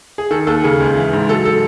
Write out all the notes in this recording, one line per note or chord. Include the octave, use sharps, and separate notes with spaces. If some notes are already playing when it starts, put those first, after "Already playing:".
G#4
D#3 A4
D#2 A4
C#3 G#4
C#2
E3
G#2
F#3 A4
A4